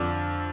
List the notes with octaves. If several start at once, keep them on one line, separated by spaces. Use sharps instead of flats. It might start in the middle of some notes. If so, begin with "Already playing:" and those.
Already playing: F2 D3 D4